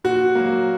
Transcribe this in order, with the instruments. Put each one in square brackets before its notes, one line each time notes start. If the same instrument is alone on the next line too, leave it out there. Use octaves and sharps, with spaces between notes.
[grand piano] A#2 [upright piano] F#4
[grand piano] F#3 A#3